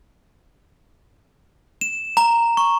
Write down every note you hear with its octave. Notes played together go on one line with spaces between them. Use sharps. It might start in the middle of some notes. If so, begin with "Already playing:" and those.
E7
A#5
C#6